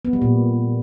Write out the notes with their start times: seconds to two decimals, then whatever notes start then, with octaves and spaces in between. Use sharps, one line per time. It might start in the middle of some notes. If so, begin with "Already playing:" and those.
0.05 B3
0.13 G3
0.22 A#2